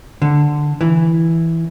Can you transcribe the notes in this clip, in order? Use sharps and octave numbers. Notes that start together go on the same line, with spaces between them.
D3
E3